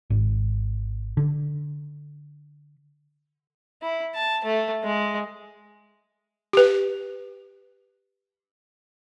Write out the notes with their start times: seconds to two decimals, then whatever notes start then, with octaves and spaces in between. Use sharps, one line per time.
0.10 G#1
1.17 D3
3.82 E4
4.15 A5
4.45 A3
4.83 G#3
6.53 G4 B4